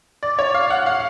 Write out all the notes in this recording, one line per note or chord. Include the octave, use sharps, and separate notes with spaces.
D5
C#5
F5
F#5
F5